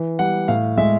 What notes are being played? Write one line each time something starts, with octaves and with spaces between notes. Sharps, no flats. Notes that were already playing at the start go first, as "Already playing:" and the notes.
Already playing: E3
G3 F#5
A2 F5
G#3 E5